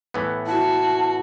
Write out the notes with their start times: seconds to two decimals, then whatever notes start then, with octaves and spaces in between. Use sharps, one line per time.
0.14 A2 E3 B3
0.47 E4 F#4 A5